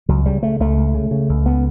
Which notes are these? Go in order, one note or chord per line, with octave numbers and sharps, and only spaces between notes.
C#2 F#3
C#3 G3
C#3 A3
C#2 A3
C#2
C#3
C#3
C#2
C#2 B3